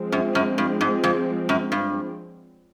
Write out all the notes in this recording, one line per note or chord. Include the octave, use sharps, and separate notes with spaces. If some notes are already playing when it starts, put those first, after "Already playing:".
Already playing: F3 G#3 C4
F#2
F#2
G2
G#2
F2
F#2
G2